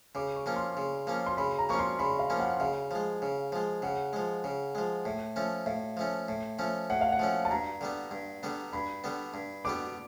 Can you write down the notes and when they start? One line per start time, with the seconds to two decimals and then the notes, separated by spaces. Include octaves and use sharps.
0.15 C#3 D6
0.36 C#6
0.46 F3 A#3 C#4
0.56 C6
0.77 C#3
1.07 F3 A#3 C#4
1.26 C6
1.37 C#3 B5
1.58 A#5
1.69 F3 A#3 C#4 C#6
1.79 C6
1.99 C#3 B5
2.19 F5
2.30 F3 A#3 C#4
2.40 F#5
2.60 C#3 F5
2.91 F3 G#3
3.22 C#3
3.52 F3 G#3
3.82 C#3 F#5
4.13 F3 G#3
4.44 C#3
4.75 F3 G#3
5.05 A2
5.36 F3 A3 C#4
5.66 A2 F5
5.97 F3 A3 C#4
6.28 A2
6.59 F3 A3 C#4
6.90 A2 F#5
7.01 F5
7.12 F#5
7.19 F3 A3 C#4
7.45 A5
7.50 G2 A#5
7.81 D3 G3 B3
8.11 G2
8.43 D3 G3 B3
8.73 G2 B5
9.04 D3 G3 B3
9.34 G2
9.65 D3 G3 B3 D6